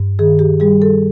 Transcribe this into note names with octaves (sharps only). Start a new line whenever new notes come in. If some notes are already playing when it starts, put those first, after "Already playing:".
Already playing: G2
D#3 G#4
G4
G3 G#4
A4